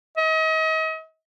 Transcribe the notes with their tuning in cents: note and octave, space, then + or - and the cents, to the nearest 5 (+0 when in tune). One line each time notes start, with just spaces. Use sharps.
D#5 +40